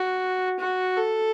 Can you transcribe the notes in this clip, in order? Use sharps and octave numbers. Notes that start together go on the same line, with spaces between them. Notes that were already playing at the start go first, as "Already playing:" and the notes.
Already playing: F#4
F#4
A4